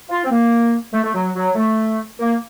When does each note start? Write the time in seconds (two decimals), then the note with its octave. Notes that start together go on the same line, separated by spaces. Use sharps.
0.10 F4
0.25 C4
0.31 A#3
0.93 A3
1.04 A3
1.15 F#3
1.36 F#3
1.56 A3
2.20 A#3